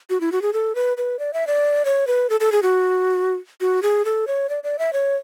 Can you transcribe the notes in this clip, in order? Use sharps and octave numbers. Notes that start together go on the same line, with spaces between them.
F#4
E4
F#4
G#4
A4
B4
B4
D5
E5
D5
C#5
B4
A4
A4
G#4
F#4
F#4
G#4
A4
C#5
D5
D5
E5
C#5